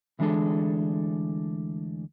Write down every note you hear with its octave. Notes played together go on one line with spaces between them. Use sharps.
D2 E3 G#3 D4 G#4 A4